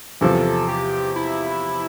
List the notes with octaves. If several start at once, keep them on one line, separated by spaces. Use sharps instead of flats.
E2 C3 F3 A4
G4
E4